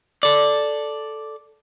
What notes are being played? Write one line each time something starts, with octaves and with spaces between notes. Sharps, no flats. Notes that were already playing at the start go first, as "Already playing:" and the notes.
A4 D5